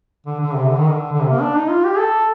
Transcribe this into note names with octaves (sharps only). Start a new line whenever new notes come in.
D3
D3
C3
D3
D#3
D3
D3
C3
A#3
D4
D#4
F4
G4
A4